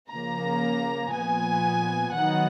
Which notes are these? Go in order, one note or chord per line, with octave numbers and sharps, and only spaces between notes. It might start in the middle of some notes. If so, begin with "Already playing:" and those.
C#3 F3 A#3 A#5
A#2 F3 B3 G#5
D#3 F#3 B3 D#4 F#5